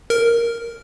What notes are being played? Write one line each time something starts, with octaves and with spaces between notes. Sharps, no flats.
A#4